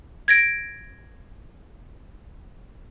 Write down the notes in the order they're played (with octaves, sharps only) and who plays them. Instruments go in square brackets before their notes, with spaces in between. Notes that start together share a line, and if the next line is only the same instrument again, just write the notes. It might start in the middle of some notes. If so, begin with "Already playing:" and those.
[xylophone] G#6 A#6 D7